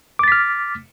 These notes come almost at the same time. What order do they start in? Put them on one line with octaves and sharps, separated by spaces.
D6 A6 B6 F6